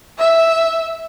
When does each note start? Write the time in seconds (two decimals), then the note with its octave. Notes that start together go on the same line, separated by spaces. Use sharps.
0.19 E5